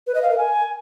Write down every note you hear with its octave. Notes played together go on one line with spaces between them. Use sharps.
B4
D#5
F5
A#4
G#5